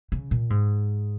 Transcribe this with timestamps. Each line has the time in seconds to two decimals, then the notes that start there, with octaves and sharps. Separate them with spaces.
0.12 C#3
0.31 A#2
0.50 G#2